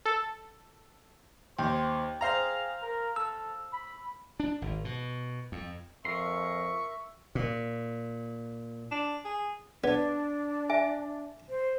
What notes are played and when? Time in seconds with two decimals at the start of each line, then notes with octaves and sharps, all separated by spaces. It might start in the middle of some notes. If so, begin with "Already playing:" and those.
0.05 A4
1.59 D#2 C5 G5
2.21 G#4 C5 F5 A#5
2.82 A#4
3.16 A4 E6
3.73 B5
4.40 D4
4.62 G#1
4.85 B2
5.52 F2
6.05 F2 A#4 E5 C6 C#6
7.35 A#2
8.91 D4
9.25 G#4
9.84 B3 D4 D5
10.70 E5 G#5
11.49 C5